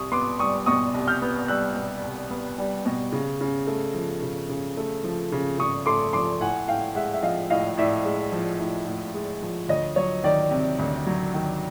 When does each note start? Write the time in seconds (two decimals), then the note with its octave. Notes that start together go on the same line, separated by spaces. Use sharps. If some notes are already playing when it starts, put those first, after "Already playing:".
Already playing: C2 C#6 D#6
0.12 B3 C6 D6
0.39 G3 C#6 D#6
0.66 B2 C#6 D#6
0.94 C2
1.07 F6 G6
1.22 B3
1.48 G3 E6 F#6
1.76 B2
2.04 C2
2.30 B3
2.58 G3
2.86 B2
3.12 C#3
3.41 C#3
3.67 A3
3.94 F3
4.22 C#3
4.49 C#3
4.77 A3
5.04 F3
5.32 C#3
5.58 C#3 C#6 D#6
5.86 A3 C6 D6
6.13 F3 C6 D6
6.40 A2 F#5 G#5
6.68 A2 F5 G5
6.95 G#3 E5 F#5
7.14 E5
7.22 F3 D#5 F5
7.50 A2 D#5 F5
7.77 A2 D5 E5
8.05 G#3
8.32 F3
8.59 A2
8.87 A2
9.15 G#3
9.42 F3
9.69 D2 C#5 D#5
9.96 F#3 C#5
10.24 D#3 D5
10.51 C3
10.79 D2
11.06 F#3
11.34 D#3